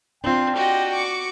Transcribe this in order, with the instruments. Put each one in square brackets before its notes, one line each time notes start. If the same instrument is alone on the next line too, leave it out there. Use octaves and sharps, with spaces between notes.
[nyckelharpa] C4 [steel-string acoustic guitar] D4 F4 [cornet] G5
[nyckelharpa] F#4 [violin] G4 D#5
[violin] C#6 D6